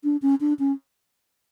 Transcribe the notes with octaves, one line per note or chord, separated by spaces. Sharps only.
D4
C#4
D4
C#4